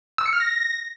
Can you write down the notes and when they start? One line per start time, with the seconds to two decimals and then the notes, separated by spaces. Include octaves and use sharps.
0.18 E6
0.26 C#7
0.33 F6
0.40 A#6